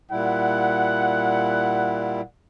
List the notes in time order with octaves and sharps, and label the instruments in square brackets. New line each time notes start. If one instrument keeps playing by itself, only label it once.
[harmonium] A#2 G3 E4 [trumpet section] F#5